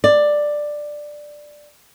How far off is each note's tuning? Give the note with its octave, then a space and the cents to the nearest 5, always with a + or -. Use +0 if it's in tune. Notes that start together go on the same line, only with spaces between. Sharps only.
D5 +10